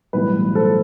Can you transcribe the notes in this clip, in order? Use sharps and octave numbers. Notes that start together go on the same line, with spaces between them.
B1 A2 E3 G3 B3 B4
A4 C5